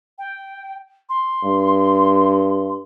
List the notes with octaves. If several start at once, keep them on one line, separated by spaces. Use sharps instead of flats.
G5
C6
G2